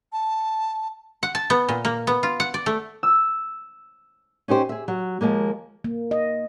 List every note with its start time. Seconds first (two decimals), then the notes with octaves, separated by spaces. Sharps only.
0.13 A5
1.23 F#5
1.35 A5
1.50 B3
1.69 A#2
1.85 A#3
2.07 B3
2.23 F4
2.40 F#5
2.54 D5
2.66 A3
3.03 E6
4.48 C#4 D#4 G4 C5
4.69 G#4 E5
4.88 F#3
5.21 D#2 F3 G#3 A#3
5.84 A#3
6.11 D#5